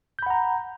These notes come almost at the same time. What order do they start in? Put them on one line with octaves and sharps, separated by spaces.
G6 B5 F#5 A#5